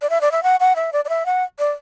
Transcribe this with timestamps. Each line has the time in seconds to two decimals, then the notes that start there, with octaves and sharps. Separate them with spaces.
0.02 D5
0.10 E5
0.21 D5
0.32 E5
0.43 F#5
0.60 F#5
0.76 E5
0.93 D5
1.05 D5
1.09 E5
1.26 F#5
1.59 D5